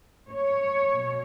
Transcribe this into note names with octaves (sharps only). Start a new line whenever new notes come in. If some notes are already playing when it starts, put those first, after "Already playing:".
C#5
B2